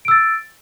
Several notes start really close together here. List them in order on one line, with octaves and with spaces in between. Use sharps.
D7 E6 A6